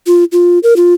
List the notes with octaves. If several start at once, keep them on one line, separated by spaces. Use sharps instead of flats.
F4
F4
A#4
F4